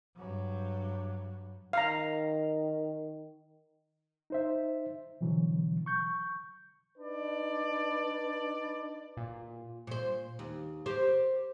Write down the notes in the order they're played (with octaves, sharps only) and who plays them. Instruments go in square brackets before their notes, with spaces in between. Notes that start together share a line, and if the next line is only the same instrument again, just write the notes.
[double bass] G2 F#3
[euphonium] D#3 [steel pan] F5 A#5
[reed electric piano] D#4 C5 E5
B2 D3 E3 F#3
C#6 G6
[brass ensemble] D4 D#4 B4 D5
[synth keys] A#2
[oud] A#2 C5
D#2
G4 A#4 C5